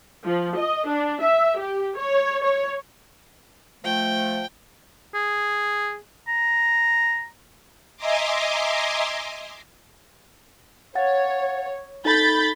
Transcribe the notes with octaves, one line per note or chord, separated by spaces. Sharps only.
F3
D#5
D4
E5
G4
C#5
C#5
F3 A3 G5
G#4
A#5
D#5 E5 G#5 A#5 C6 D6
C#5 F5 F#5 A6
D#4 A4 B5 G6 A6